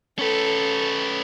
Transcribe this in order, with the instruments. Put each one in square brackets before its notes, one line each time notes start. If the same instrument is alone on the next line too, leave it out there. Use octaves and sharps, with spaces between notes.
[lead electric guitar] C#4 B4 [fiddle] A4